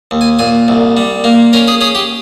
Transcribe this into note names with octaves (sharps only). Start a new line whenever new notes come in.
D#2
G#5
A#2 G#5
C2
G3
A#3
C#4 A#4
G#4
C#4 G#4
G4